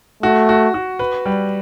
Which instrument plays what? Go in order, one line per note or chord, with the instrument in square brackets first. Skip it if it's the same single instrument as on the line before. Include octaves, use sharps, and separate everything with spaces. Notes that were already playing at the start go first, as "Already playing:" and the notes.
[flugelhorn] A3 [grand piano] F#4
[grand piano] F#4
F#4
B4
G3